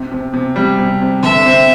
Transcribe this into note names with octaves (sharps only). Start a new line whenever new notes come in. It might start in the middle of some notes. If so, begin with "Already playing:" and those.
Already playing: C3
C3
C3
G3
C3
C3
D3 E5
C4